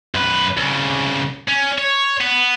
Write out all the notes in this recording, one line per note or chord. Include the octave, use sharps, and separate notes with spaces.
F#2 B4
C2 C#3
C#4
C#5
B3